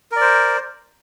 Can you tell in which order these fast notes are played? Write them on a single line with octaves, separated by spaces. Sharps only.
A#4 D5 C5